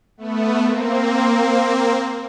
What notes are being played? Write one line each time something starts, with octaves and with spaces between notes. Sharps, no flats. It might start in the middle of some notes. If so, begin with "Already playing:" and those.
A3 B3
A#3 C4